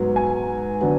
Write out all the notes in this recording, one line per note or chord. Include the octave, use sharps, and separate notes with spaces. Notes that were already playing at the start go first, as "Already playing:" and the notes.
Already playing: G#2 F#3 B3
G#5
D3 F#3 B3